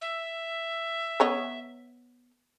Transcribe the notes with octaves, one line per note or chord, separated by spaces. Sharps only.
E5
B3 C#5 D#5